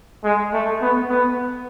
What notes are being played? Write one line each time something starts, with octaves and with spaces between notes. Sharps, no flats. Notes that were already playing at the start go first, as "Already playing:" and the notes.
G#3
A3
B3
B3